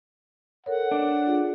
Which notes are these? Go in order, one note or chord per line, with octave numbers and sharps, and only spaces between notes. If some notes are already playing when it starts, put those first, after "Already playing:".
A4 A#4 C#5 F#5
D4 D5
F4 G#4